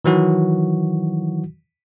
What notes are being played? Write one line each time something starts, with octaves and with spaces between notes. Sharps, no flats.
D#3 E3 F#3 F#4